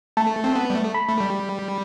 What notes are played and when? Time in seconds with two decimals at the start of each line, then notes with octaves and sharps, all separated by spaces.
0.17 A3 A5
0.44 C4
0.55 B3
0.70 G3
0.75 A3
0.94 B5
1.08 A3
1.20 G3